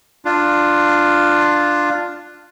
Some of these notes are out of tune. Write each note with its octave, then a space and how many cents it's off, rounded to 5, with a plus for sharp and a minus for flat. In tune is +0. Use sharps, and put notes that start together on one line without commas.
D4 +15 F4 +0